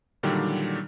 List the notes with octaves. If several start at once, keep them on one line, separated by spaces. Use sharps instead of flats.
A#2 D3 D#3 F#3 G3 G4